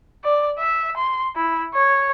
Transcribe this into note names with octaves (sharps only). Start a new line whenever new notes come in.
D5
E5
C6
E4
C#5